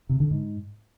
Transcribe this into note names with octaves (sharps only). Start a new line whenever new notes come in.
C3
D3
G#2